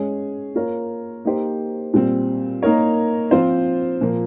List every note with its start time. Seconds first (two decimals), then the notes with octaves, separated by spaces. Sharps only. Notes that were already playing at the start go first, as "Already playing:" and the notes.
Already playing: G#3 C#4 G#4 C#5
0.55 A#3 F4 A#4 C#5
1.25 A#3 D#4 G4 C5
1.93 A#2 G3 C4
2.63 A#3 D#4 A#4 C#5
3.31 F3 C4 F4 C5
4.01 A#2 F3 A#3